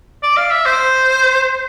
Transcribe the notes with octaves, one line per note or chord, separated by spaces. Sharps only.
D5
F5
E5
C5